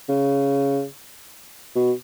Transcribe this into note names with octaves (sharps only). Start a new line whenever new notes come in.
C#3
B2